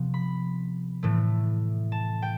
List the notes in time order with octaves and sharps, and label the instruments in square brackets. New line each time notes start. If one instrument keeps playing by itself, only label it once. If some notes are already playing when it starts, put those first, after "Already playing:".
Already playing: [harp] C3 F3 B3
B5
A2 E3 A3
A5
G5